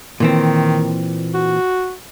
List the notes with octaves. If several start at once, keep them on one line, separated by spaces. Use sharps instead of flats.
A#2 D#3 E3 C4
F#4